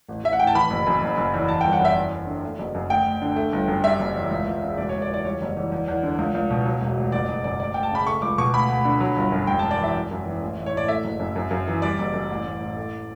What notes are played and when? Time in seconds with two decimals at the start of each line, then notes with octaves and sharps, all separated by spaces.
0.09 A1
0.23 A1 E5
0.33 F#5
0.39 A2 G5
0.47 A5
0.55 E3 B5
0.70 F#1
0.87 F#2
1.02 F#1
1.17 F#1
1.34 E2
1.48 E3 A5
1.61 G1 G5
1.73 F#5
1.80 F#2
1.85 E5
1.96 E2
2.12 E2
2.27 D3
2.43 A3
2.59 F#1
2.75 F#2
2.89 D2 G5
3.06 D2
3.22 D3
3.36 A3
3.53 G1
3.68 F#2
3.84 G3 E5
3.99 F#1
4.16 E2
4.31 C#2
4.46 C#2
4.62 C#3
4.77 E1 D5
4.89 E1 C#5
5.02 D5
5.09 E2
5.14 D5
5.25 G3 C#5
5.41 F#1
5.57 E2
5.72 E2
5.88 E2
6.03 D3
6.18 C#2
6.34 C#2
6.51 B2
6.66 F#3
6.81 E1
6.97 D2
7.12 F#1 D5
7.28 F#1
7.44 F#2 D5
7.60 D2 D5
7.74 D2 G5
7.83 A5
7.91 C#3 B5
8.07 A3 C#6
8.22 C#2 D6
8.38 B2 C#6
8.54 D2 B5
8.69 D2
8.85 D3
9.00 F#3
9.16 G1
9.32 F#2
9.47 E1 G5
9.59 E1 A5
9.71 D5
9.80 E2 E5
9.95 F#2
10.11 F#2
10.26 E3
10.42 A1
10.58 A1
10.66 C#5
10.73 A2 D5
10.88 A3 E5
11.04 F#1
11.20 F#2
11.36 F#2
11.51 F#2
11.67 E3
11.82 G3 D5
11.98 F#1
12.14 F#2
12.30 A1
12.45 A1
12.60 A2
12.77 A3